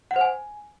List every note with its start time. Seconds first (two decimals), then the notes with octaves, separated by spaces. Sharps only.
0.11 F#5
0.16 C5
0.21 G#5